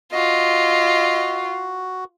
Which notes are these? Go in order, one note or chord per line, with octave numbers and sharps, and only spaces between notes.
F4 F#4 D#5